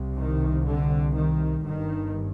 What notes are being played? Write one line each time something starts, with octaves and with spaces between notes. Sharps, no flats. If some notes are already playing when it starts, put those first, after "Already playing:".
Already playing: C2 C3
D#3
D3
D#3
G1 G2 D#3